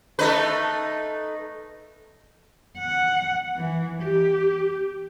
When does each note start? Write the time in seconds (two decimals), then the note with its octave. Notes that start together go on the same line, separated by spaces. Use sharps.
0.19 A3 D#4 B4
2.79 F#5
3.56 E3
4.03 G4